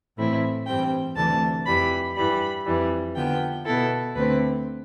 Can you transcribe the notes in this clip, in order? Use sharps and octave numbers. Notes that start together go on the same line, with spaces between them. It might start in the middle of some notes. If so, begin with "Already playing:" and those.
A2 E3 A3 C4 E4
G2 E3 G3 C4 G5
D2 C3 E3 A3 D4 A5
F2 E3 G3 B5
G2 E3 G3 B5
F2 E3 G3
D3 F3 B3 G5
B2 B3 E4 A4
D2 D3 A3 C4 B4